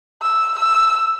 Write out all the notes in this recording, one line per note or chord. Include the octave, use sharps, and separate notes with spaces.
E6
E6